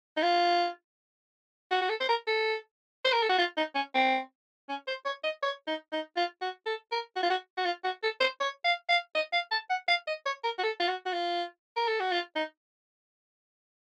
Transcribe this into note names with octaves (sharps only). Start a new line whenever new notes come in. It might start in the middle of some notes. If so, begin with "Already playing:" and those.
D#4
F4
F#4
F#4
A4
C5
A#4
A4
C5
A#4
A4
F#4
F4
D#4
C#4
C4
C#4
C5
C#5
D#5
C#5
D#4
D#4
F4
F#4
A4
A#4
F#4
F4
F#4
F#4
F4
F#4
A4
C5
C#5
F5
F5
D#5
F5
A5
F#5
F5
D#5
C#5
A#4
F#4
A4
F4
F#4
F#4
F4
A#4
A4
F#4
F4
D#4